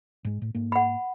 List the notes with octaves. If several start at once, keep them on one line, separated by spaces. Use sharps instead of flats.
G#2 G#3
A2
G#2 A#3
F#5 B5